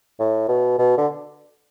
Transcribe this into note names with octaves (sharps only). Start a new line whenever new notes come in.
A2
B2
B2
D3